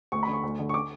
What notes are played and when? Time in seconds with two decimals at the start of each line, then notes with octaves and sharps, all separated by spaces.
0.12 D2 C#6
0.23 B5
0.28 D3
0.33 C#6
0.43 D2
0.59 D3
0.69 C#6
0.74 D6